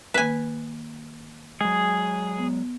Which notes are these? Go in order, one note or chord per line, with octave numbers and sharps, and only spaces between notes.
D#3 A#3 B4 G#5
F#3 G#3 G#4
B3